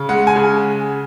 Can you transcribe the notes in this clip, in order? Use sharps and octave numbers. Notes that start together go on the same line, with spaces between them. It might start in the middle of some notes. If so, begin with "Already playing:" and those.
Already playing: C#3
G#3 F#5
G#5
C#3